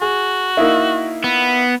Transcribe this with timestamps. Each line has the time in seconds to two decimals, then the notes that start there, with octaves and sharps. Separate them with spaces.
0.01 F#4 G#4
0.57 A#3 D#4 E4
1.24 B3